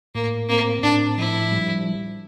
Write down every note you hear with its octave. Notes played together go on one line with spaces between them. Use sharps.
A2 A#3
A#3 C4
A2 D4
F3 E4
G3